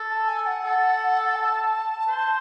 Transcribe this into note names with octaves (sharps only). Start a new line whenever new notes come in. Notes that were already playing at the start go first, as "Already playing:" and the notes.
Already playing: A4
A5
G#5
F#5
A4
A5
C5